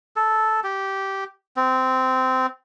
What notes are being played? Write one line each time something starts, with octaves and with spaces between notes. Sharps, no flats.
A4
G4
C4